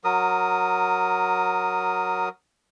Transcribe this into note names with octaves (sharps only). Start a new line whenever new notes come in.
F#3 A#4 D#6